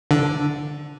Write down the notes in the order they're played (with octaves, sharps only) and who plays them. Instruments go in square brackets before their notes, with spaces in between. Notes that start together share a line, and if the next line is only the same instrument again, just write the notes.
[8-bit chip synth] D3